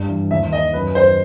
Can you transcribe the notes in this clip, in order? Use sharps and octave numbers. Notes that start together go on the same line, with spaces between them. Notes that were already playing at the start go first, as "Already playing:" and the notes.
Already playing: G2
E3
D#2 E5
D#3 D#5
F#2 B4
D#3 C5